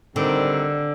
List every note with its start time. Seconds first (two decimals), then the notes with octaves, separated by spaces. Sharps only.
0.16 D3 D#3 G3 C4